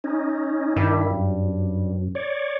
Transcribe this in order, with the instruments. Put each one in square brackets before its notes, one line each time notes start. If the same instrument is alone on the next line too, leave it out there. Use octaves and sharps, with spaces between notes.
[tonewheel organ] C#4 D#4
[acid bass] G2 [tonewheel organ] D#3 E4
[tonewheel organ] F#2
C#5 D5